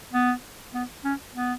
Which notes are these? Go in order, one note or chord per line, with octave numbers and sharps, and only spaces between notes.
B3
B3
C#4
B3